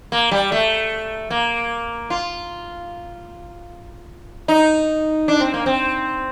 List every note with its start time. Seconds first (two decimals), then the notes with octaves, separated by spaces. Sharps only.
0.12 A#3
0.31 G3
0.52 A3
1.30 A#3
2.10 F4
4.48 D#4
5.28 D4
5.40 C4
5.54 A#3
5.66 C4